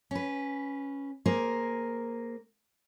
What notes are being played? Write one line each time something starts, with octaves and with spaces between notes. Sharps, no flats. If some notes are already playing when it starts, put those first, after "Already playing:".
C#4 B4
A#3 G#4 A#4 C5